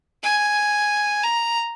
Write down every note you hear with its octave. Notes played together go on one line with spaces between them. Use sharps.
G#5
A#5